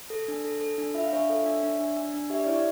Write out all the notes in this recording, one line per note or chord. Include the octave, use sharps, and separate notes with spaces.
A4
D4
A4
A4
D4
F4 E5
F5
D4 C#5 E5
A4
D4
D4
D4
D4
D4
G4 E5
D5
E4 C#5
D5